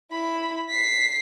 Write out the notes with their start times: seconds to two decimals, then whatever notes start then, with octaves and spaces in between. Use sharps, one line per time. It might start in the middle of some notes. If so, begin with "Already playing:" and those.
0.11 E4 B5
0.70 B6 C7